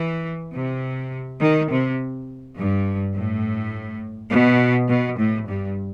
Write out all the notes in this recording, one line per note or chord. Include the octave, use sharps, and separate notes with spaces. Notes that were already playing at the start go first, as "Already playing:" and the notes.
Already playing: E3
C3
D#3
C3
G2
A2
B2
B2
A2
G2